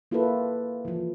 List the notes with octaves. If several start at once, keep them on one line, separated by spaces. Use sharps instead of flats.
A#3 E4 F4 G4 A4 B4
E3 F3